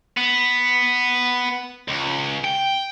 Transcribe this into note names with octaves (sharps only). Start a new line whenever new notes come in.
B3
C#2
G5